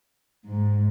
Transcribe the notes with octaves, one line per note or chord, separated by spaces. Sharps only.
G#2